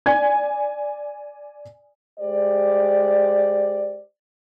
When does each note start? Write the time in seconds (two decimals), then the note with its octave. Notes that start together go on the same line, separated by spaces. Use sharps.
0.06 D5 G#5 G#6
2.19 G#3 G4 C5 D5